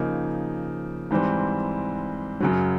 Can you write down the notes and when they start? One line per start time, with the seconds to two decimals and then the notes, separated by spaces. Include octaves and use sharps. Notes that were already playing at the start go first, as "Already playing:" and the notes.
Already playing: C#3 F3 A#3 D#4
1.11 G#2 E3 G3 C4
2.40 F#2 C#3 F#3